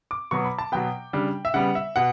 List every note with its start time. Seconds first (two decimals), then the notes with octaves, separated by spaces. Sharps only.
0.11 D6
0.31 B2 F#3 B3 C#6
0.44 B5
0.59 A5
0.72 B2 F#3 B3 G5
1.13 C#3 G3 D4
1.45 E5
1.54 C#3 G3 B3 F#5
1.75 E5
1.96 B2 F#5